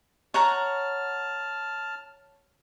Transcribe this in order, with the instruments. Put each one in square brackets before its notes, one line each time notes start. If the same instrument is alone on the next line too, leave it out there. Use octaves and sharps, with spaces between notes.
[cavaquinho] C#5 F#5 A#5 [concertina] A5 F6